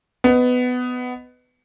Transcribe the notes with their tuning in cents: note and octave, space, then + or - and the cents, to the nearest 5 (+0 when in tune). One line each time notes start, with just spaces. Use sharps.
B3 +15 D#5 +0